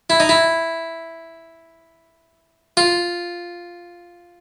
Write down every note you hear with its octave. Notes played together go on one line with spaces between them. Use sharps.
E4
D#4
E4
F4